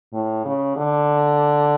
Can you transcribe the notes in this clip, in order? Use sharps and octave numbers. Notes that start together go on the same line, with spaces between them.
A2
C#3
D3